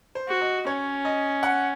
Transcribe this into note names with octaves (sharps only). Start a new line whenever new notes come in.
C5
F#4
D#5
C#4 C#5
D#5
F#5